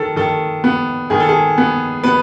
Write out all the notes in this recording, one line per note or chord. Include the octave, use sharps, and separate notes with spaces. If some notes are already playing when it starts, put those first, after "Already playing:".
Already playing: D#3 A4
D#3 A4
B3
D#3 G#4
A4
G#4
B3
B3 B4